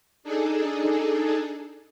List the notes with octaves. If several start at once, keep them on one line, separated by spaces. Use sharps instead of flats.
D4 D#4 G#4 A4